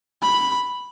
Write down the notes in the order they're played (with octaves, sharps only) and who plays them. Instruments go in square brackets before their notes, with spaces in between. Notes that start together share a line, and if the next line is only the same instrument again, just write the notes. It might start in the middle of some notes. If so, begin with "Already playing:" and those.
[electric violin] B5